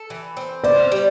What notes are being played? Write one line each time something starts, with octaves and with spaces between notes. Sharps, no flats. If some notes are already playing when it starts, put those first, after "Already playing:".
Already playing: A4
E3
C4
C5 D5
G3